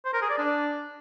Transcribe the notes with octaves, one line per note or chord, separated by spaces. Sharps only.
C5
A#4
G#4
D5
D4